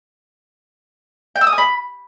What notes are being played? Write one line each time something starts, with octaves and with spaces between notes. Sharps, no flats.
G5
E6
D#6
G#5
B5